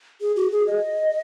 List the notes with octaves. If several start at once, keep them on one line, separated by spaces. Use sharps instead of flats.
G#4
F#4
G#4
D#5